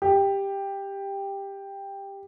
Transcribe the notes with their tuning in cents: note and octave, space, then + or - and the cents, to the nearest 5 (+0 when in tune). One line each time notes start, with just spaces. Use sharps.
G4 +10